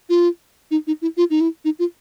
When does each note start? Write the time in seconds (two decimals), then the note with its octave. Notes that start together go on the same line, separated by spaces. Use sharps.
0.09 F4
0.71 D#4
0.87 D#4
1.02 E4
1.17 F4
1.30 D#4
1.41 E4
1.65 D#4
1.79 F4